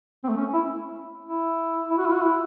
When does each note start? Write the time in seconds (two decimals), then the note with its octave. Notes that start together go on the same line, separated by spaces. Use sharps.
0.24 C4
0.29 A3
0.37 C#4
0.53 E4
1.25 E4
1.90 E4
1.98 F#4
2.06 E4
2.14 F#4
2.22 E4